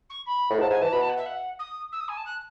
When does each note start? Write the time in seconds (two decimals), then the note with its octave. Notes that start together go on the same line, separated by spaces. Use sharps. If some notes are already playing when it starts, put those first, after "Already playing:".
0.09 C#6
0.26 B5
0.51 A2
0.59 G#2 A5
0.70 G#2 G#5
0.81 E3 A5
0.92 B2 B5
1.01 A5
1.09 F#5
1.17 E5
1.26 F#5
1.59 D#6
1.92 E6
2.00 D#6
2.08 G#5
2.17 A5
2.25 F#6